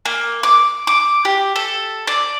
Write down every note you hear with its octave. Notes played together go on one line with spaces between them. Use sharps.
A#3
D6
D6
G4
A4
D5